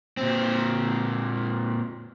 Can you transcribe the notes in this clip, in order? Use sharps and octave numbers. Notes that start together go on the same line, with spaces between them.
A#2 C4